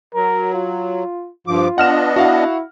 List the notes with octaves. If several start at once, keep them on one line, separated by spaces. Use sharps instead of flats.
F#3 A#4
F4
G2 F3 F4 D6
B3 D4 D#5 F#5 F6 E7
E4 F#4 F5 F#5